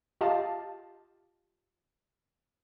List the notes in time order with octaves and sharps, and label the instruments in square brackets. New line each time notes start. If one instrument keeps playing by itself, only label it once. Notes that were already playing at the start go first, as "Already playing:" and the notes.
[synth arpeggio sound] F4 G4 D#5 F5 A5